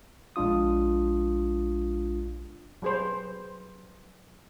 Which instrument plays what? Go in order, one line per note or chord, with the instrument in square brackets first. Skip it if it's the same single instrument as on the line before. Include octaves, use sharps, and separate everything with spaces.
[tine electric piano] A#1 G#3 D4 F4 D#6
[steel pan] F#3 G3 G#4 B4 C5